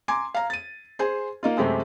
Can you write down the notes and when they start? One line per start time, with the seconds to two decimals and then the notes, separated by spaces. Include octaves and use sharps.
0.08 G#5 A#5 C6 D6 G#6
0.34 F5 A#5
0.50 A6 D#7
0.99 G#4 C5 G#5
1.43 A#3 D#4 F4
1.57 F#2 C3 G#3 A3 C4 G4